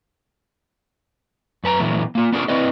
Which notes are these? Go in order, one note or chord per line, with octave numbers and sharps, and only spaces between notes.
F#2 B4 A5 A#5
A#2 E3 F#3 A3 B3
A#3 F4
B3 C#4 D4 F4 G#4 A#4
C4 E4 B4 D5 D#5